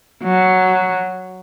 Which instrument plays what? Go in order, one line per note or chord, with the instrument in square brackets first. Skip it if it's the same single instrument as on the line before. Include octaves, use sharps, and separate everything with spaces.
[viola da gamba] F#3